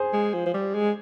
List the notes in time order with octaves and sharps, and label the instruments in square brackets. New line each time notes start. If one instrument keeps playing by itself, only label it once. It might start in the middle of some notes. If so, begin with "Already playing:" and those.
Already playing: [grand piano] G#4 C5
[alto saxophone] G#3
F3
F3
G3
G#3